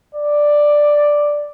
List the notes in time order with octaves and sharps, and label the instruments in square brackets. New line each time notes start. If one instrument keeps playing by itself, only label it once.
[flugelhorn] D5